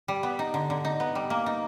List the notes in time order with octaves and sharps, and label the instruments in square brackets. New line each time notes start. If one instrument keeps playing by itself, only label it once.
[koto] G3
B3
D#4
D3
D3
D#4
B3
G3
A#3
D#4